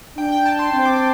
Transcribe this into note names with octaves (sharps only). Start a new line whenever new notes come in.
D4 G5
G5
A5
C6
C4 C6
D6
C6